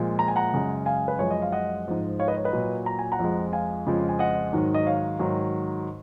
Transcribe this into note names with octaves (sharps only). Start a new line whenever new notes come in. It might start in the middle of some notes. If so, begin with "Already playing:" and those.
Already playing: A#2 F3 G#3
A#5
G#5
F#5 A#5
F#2 C#3 G#3
F5 G#5
B4
F#2 F3 G#3 C#5
D#5
F5
D#5 F#5
G#2 F3 G#3
C#5 F5
B4 D#5
C#5
B4 D#5
A#2 F#3
A#5
G#5
F#5 A#5
F2 F3 G#3
F5 G#5
F2 C#3 F3 G#3
G#5
D#5 F#5
G#2 D#3 F#3
D#5
C#5 F5
G#2 D#3 F#3